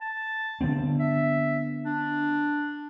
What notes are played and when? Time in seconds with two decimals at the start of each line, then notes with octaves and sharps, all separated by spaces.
0.01 A5
0.61 D3 B3 C4
0.99 E5
1.85 D4